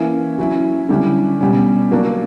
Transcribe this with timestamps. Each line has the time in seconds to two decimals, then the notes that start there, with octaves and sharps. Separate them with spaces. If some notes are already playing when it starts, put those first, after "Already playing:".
Already playing: E3 A#3 C#4 E4
0.38 F#3 C#4 E4
0.89 D3 G3 C#4 E4
1.41 B2 G3 C#4
1.91 F#3 A#3 D4